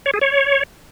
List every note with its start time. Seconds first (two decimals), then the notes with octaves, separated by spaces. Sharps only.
0.06 C#5
0.14 G#4
0.21 C#5